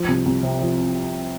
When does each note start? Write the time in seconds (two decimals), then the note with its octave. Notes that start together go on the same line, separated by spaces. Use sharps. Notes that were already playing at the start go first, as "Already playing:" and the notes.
Already playing: F3
0.08 C2
0.26 C2
0.43 C3
0.61 F3